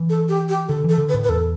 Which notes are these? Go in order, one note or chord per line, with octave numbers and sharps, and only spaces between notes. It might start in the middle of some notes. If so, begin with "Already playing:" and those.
Already playing: E3
A4
G4
G4
D3 A4
E3 A4
D3
B4
A2
B4
E2 A4